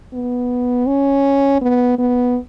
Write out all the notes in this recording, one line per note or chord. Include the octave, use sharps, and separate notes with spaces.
B3
C#4
B3
B3